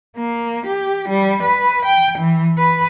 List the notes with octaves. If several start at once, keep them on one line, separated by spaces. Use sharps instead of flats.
A#3
G4
G3
B4
G5
E3
B4